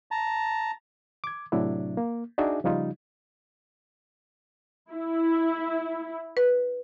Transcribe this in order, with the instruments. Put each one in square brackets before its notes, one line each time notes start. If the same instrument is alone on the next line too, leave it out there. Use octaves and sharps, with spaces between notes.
[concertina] A5 A#5
[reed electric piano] D6 G#6
A2 C3 F#3 D4 E4
A#3
D4 D#4 F#4 G#4 E5 G#5
C#3 F3 G3 D#4 F4
[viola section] E4
[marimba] B4